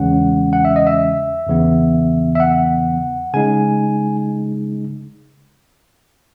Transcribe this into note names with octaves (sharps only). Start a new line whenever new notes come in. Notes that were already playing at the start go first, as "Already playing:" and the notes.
Already playing: E2 C#3 E3 G#3 C#4 F#5
F#5
E5
D#5
E5
E2 C#3 E3 B3
E5
F#5
C#3 G#3 D#4 G#5